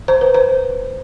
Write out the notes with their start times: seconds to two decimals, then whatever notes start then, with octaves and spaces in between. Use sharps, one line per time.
0.08 C5
0.21 B4
0.34 C5